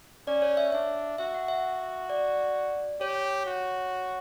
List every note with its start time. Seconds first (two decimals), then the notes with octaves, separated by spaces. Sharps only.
0.27 C#4 D5
0.42 C#5
0.57 E5
0.72 D4 E5
1.18 F#4 E5
1.34 F#5
1.48 E5
2.10 D5
3.01 G4 C#5
3.46 F#4